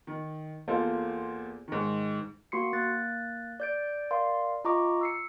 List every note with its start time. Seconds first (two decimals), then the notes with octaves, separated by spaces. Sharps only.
0.07 D#3
0.68 E2 A#3 F4 A4 C5
1.68 G#2 D#3
2.52 A#3 F#4 C6 C7 C#7
2.73 A#3 F#6 A6
3.60 D5 G6 D7
4.11 A#4 D5 F5 C6
4.65 F4 D#5 A#5 C#6 D6
5.01 E6 C7 C#7